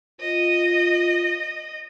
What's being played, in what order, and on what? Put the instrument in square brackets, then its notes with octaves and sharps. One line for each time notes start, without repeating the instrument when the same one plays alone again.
[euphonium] F4 [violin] D#5